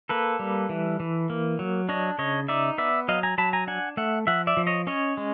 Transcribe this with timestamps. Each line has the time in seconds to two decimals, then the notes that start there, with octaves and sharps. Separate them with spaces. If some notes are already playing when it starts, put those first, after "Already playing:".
0.09 A#3 A4 B4
0.39 G3
0.69 E3
1.00 E3
1.30 A#3
1.59 F#3
1.89 D4 C#5 D#5
2.18 C#3 C#5 D#5
2.48 D#4 D5 E5
2.78 B3 D5 E5
3.08 F#3 D#5 F5
3.23 G#5 A#5
3.38 F#3 A5 B5
3.53 G#5 A#5
3.67 D4 F#5 G#5
3.97 A3 E5 F#5
4.27 F3 E5 F#5
4.47 D5 E5
4.57 F3
4.67 C#5 D#5
4.87 C#4 C#5 D#5
5.17 G#3